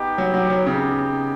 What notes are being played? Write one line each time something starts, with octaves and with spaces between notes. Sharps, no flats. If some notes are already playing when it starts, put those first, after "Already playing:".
Already playing: B3 D#4 G4
F#3
F#3
F#3
C#3